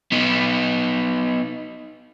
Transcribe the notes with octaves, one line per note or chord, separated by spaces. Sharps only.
B3 D#4